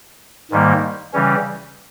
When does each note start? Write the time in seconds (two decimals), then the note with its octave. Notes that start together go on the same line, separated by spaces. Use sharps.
0.51 G#2 D#3 G3 A#3
1.13 C#3 E3 G3 C#4